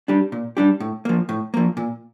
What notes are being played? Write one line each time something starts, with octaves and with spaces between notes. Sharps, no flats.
G3 D4 G4
A#2
G3 D4 G4
A2
F3 A#3
A2
F3 A#3
A#2